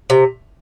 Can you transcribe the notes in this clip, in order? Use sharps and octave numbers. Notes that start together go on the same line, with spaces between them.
C3